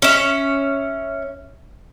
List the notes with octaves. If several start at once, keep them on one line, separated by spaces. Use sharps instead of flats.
C#4 E5